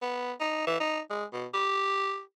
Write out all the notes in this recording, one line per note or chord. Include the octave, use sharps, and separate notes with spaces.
B3
D#4
E3
D#4
G#3
B2
G4